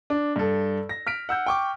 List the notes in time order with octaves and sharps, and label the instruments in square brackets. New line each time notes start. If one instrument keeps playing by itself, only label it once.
[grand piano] D4
G2 A4
A#6
F6 B6 D7
F#5 E6 G6
G5 C#6 D6